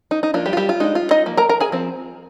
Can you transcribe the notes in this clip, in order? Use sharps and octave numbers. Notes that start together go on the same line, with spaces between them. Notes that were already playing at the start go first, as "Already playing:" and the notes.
D#4
D#4
F3 A#3 D4 F4
G3 G4
F4
G3 G4
F4
G#3 D4 D#4
F4
D#4 D#5
F3 A#3
A#4 A#5
A#4 A#5
G#4 G#5
F3 C4